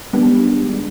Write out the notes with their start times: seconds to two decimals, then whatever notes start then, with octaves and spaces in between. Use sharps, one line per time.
0.13 D#3 G3 G#3 B3 D4